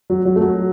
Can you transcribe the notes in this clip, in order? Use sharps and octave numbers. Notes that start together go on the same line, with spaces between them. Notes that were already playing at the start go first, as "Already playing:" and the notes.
F#3
F#3
A3
F#3